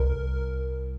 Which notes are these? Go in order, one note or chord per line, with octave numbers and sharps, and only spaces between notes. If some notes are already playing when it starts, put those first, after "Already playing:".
Already playing: C2 A#4